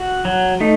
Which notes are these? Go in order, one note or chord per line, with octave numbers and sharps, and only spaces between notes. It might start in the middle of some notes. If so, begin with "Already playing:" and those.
Already playing: F#4
F#3
A3 D#4